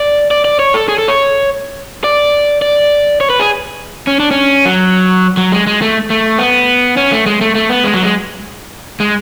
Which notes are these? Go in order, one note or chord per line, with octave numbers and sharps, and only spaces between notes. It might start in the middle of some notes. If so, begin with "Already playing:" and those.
Already playing: D5
D5
D5
C#5
A4
G#4
A4
C#5
D5
D5
C#5
B4
G#4
C#4
D4
C#4
F#3
F#3
G#3
G#3
A3
A3
B3
C#4
A3
G#3
A3
A3
B3
G#3
F#3
G#3
G#3